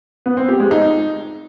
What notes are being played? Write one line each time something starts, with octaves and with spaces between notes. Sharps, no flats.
B3
C4
G4
G#3
D#4